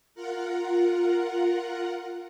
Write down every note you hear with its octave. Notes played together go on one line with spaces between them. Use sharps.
F4 A#4 F#5